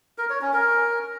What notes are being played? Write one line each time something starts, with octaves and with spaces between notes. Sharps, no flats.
A#4
C#5
C#4
A#4